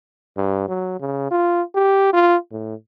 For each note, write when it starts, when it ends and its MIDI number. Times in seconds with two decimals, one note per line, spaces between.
0.37 0.66 43
0.68 0.96 54
1.00 1.30 49
1.31 1.62 65
1.75 2.09 67
2.13 2.36 65
2.51 2.74 45